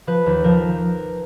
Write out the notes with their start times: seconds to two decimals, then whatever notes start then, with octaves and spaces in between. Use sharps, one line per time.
0.07 F3 B4
0.26 D#2
0.44 F3 A#4